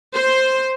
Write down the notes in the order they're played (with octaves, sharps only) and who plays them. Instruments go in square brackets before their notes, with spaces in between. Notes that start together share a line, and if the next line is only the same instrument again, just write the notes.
[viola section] C5